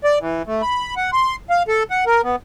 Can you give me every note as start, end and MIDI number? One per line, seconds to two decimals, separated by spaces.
0.04 0.19 74
0.20 0.42 52
0.47 0.62 57
0.62 0.95 83
0.97 1.11 78
1.13 1.36 84
1.50 1.63 77
1.68 1.83 69
1.91 2.05 78
2.07 2.21 70
2.24 2.36 59